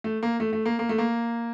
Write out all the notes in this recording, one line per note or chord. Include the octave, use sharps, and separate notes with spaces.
A3
A#3
A3
A3
A#3
A#3
A3
A#3